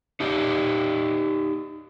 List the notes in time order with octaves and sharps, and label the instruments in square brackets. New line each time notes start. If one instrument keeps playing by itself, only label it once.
[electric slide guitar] D#4 G4 D5 D#5